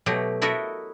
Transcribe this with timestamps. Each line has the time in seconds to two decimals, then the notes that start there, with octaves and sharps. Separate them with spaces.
0.06 B2 F#3 A3 G4
0.42 E4 F#4 A4 A#4 D#5 E5